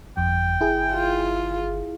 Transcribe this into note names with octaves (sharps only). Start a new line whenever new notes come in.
G1 F2 G5
E4 G#4
F4